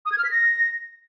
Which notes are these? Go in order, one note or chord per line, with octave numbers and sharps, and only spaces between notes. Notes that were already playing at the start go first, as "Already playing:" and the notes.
D#6
G#6
F6
B6
A#6